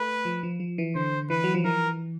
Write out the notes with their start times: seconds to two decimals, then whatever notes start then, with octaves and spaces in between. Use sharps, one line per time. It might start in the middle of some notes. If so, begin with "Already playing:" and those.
Already playing: A3 B4
0.25 F3
0.43 F3
0.60 F3
0.78 E3
0.95 D3 C5
1.30 E3 B4
1.44 F#3
1.55 F3
1.64 E3 A#4